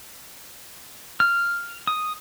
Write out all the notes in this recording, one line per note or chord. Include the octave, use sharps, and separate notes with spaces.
F6
D#6